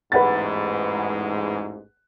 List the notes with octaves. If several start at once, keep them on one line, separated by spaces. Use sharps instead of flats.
A1 E2 G#2 B4 F#5 A6